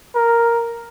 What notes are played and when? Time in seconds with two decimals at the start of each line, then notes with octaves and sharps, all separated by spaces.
0.15 A#4